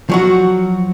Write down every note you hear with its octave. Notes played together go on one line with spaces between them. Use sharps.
F3 F#3 F#4